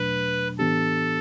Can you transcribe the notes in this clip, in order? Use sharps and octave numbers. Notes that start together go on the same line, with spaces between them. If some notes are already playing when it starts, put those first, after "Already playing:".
Already playing: E2 B2 F#3 A3 D4 B4
A2 E3 B3 D4 G4 A4